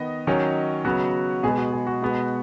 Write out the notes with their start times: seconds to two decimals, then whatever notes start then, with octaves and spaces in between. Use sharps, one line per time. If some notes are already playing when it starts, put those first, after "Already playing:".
Already playing: D#3 B3 D#5
0.27 D#3 F#3 C#4
0.85 C#3 F#3 B3 F#4
1.43 B2 G#3 B3 G#4
1.57 F#4
1.72 G#4
1.87 F#4
2.02 B2 G#3 B3